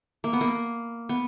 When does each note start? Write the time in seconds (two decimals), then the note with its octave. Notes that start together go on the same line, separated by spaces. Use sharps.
0.24 A#3
0.33 B3
0.41 A#3
1.09 B3